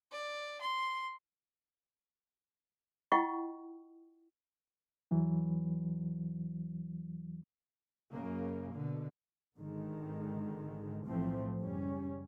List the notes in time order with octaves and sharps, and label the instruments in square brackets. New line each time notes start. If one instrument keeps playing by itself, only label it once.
[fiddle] D5
C6
[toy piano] E4 F4 D#5 F#5 G5 C#6
[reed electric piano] E2 E3 F#3
[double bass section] F#2 C#3 A#3
B2 D3
G#1 G#2 D3 D#3 G#3
B1 A2 E3 F3 A3 C4
F#1 G3 C#4